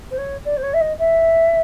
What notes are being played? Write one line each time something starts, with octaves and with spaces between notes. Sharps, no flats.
C5
C#5
D5
C5
C#5
E5
D#5
E5